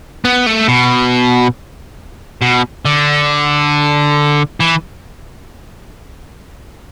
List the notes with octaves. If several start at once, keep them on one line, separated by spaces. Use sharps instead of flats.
B3
A3
B2
B2
D3
E3